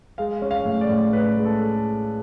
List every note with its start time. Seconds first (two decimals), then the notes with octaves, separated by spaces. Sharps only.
0.18 G#3 F5
0.42 C#4
0.51 F5
0.65 A2
0.81 D5
0.89 A2
1.13 C#4 B4
1.37 G#3
1.45 A4